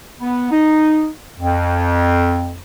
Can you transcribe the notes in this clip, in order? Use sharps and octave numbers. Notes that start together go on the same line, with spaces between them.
B3
D#4
F2